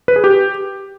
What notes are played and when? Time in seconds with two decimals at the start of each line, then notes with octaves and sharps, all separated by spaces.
0.08 B4
0.16 G#4
0.24 G4